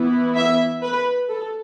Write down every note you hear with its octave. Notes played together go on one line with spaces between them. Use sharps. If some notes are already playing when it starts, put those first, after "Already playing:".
Already playing: E3 B3 E4
E5
B4
A4